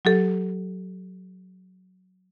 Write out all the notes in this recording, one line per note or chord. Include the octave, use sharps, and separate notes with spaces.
F#3 G4 A4